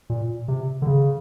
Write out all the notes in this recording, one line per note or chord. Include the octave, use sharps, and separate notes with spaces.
A#2
C3
D3
C#3